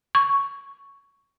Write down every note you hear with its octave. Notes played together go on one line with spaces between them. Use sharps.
C#6